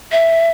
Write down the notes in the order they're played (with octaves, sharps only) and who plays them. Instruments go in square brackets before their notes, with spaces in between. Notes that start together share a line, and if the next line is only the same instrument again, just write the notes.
[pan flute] E5